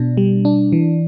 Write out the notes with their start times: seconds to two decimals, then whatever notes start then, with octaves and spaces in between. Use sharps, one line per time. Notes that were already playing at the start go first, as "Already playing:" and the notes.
Already playing: B2 D4
0.17 G3
0.45 D4
0.72 E3